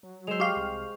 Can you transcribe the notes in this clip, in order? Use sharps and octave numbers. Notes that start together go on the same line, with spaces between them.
F#3
G#3 C5 E6 E7 F7
G4 F5 C#6 F7
C2